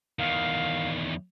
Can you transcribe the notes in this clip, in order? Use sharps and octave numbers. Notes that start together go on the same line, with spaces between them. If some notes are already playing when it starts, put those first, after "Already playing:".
E2 D#3 F5